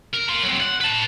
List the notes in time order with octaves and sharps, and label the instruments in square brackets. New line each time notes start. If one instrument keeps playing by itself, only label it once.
[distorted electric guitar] A#4
A#4 C6
F#3 C4
F#5
B4 A5